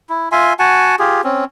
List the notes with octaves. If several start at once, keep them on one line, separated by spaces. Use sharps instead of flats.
E4
F4 E5 G#5 C6
F#4 F#5 G#5 A5
F4 G4 G#4
C4 C#4